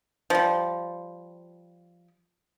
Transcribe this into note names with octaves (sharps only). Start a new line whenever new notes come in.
F3 G3